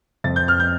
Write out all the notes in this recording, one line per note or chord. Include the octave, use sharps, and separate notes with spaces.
F2 A6
G6
F6
G6